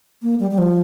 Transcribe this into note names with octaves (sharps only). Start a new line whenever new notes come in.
A#3
G3
G3
F3